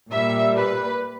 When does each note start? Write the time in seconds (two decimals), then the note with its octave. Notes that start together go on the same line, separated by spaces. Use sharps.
0.11 A#2 G3 E5
0.56 B4